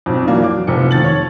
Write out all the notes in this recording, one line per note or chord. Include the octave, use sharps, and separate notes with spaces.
B1 F2
E3 F#3 A#3 D4
D6
F1 F3 C#7
D#3 F3 A6 F#7
C#5